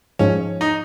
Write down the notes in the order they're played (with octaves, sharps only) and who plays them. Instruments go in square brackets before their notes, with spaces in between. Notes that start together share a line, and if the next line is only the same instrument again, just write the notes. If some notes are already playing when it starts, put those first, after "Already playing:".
[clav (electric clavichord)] G#2 F3 G#3 [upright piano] C#4
[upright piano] D#4